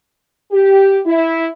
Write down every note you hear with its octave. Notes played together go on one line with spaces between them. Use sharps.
G4
E4